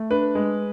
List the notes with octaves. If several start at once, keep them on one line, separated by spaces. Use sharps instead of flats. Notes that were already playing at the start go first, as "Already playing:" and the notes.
Already playing: A3
D4 B4
G#3